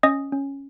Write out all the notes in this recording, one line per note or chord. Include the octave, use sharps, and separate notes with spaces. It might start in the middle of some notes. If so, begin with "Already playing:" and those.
C#4 D#5 D#6
C#4